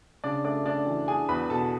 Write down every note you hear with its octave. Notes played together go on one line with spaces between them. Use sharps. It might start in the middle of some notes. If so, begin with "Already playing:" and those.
C#3 D4 D5
A3 D4 D5
A3 D4 D5
E3
D4 G#4 G#5
E2 B4 B5
B2 A4 A5